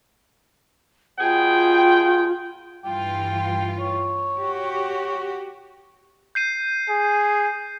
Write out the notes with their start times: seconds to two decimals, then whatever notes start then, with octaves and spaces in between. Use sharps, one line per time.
1.20 B2 F4 G#4 G5
2.84 G2 E3 F4 G5
3.80 C#5
4.38 F#4 G4
6.35 G6 C7 D#7
6.89 G#4